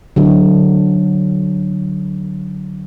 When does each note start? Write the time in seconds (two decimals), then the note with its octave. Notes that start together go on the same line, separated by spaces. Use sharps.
0.16 D3 F#3